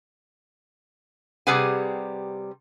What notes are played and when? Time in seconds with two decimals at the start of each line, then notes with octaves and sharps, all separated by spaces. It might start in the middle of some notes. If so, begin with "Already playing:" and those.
1.47 C3 G3 G#4 B4 F#5 G#5